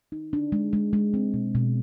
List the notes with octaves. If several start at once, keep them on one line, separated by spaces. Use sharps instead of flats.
D#4
D4
G#3
G#3
G#3
C4
B2
B2